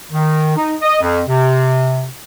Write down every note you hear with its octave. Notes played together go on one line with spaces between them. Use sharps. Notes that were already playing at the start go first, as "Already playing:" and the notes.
D#3
D#4
D#5
F2
C3